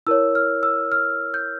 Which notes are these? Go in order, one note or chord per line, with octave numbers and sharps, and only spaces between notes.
E4 A#4 C#5 E6
F6
E6
F6
G6